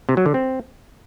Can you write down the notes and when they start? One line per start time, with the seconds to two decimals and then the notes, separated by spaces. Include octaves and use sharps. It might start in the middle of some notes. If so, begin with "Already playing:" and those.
0.09 C3
0.17 F#3
0.26 D3
0.34 C4